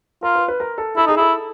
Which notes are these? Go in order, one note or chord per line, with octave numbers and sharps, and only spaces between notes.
F4 A#4
B4
B4
A#4
A4
E4 A4
D#4 G#4
E4 A4